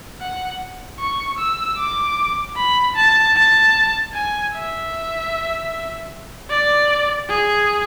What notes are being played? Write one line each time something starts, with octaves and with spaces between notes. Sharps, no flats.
F#5
C#6
E6
D6
B5
A5
A5
G#5
E5
D5
G#4